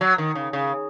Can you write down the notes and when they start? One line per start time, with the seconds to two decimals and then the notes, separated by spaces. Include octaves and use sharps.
0.01 F#3
0.18 D#3
0.35 C#3
0.53 C#3